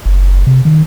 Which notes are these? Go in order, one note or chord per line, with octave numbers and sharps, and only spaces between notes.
F#1
C3
D#3